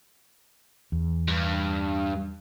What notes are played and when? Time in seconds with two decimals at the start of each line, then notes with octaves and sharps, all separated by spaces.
0.92 E2
1.28 G2